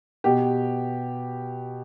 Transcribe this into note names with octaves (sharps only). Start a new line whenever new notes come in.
B2 G4